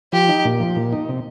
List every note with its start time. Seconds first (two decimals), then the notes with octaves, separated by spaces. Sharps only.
0.13 F3 G4
0.29 D#4
0.45 A#2
0.60 F3
0.76 A#2
0.92 D#4
1.09 C3